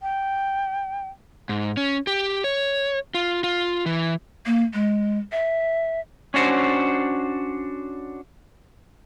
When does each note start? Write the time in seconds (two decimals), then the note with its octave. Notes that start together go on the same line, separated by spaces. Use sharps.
0.02 G5
1.49 G#2
1.77 C#4
2.07 G4
2.44 C#5
3.14 F4
3.44 F4
3.86 E3
4.46 A#3
4.74 G#3
5.32 E5
6.34 C#4 D4 F#4 C5